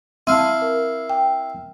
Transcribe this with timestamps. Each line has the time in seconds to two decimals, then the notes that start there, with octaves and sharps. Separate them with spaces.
0.27 C4 E4 F5 A5
0.62 A#4
1.09 G5